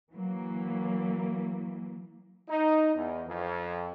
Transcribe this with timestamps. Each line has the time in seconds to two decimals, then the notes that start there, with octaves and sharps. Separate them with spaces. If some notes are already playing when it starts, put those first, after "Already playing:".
0.13 E3 F#3 A#3
2.48 D#4
2.95 E2
3.27 F2